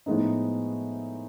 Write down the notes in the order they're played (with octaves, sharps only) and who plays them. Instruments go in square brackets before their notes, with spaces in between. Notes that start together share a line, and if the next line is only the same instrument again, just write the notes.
[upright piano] A2 F3 G#3 B3 D#4